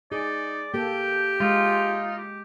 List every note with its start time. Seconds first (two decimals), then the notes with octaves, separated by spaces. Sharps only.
0.12 D#4 G#4 D5
0.74 A#3 G4 A4 G5
1.40 G#3 D#4 F4
2.17 G4